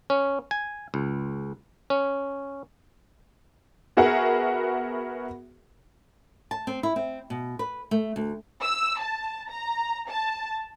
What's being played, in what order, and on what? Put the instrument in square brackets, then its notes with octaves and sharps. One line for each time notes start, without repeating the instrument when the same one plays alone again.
[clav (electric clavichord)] C#4
G#5
C#2
C#4
[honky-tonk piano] B3 F#4 G#4 A#4 E5 F#5
[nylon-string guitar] A5
C4
E4
C4
B2
B4
A3
D2
[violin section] E6
A5
A#5
A5